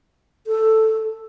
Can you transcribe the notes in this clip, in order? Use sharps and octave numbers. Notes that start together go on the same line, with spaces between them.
A4